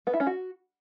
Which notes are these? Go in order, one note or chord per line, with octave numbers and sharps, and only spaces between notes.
B3
E4
C#4
F#4